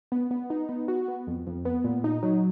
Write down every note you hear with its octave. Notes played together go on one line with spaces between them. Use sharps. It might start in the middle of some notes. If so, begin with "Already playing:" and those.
B3
B3
D#4
B3
F#4
B3
F2
F2
B3
A#2
D#4
F#3